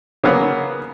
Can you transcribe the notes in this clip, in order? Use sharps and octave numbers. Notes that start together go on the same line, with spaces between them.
C#3 F#3 A#3 B3